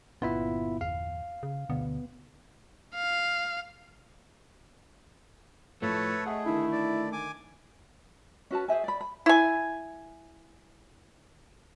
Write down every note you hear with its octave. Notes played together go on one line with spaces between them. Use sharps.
G1 A#2 B3 C#4 E4 F4 E5
E2 F5
C#3
D2 B2 D3 B3
F5
A2 F3 A3 A4 B4 C#5
G#4 D#5 E5 F#5
D3 D#3 E4
D5
G#5 D6
C#4 F#4 B4 A5
G#4 C5 E5 G#5
D5 B5
B5
E4 G#5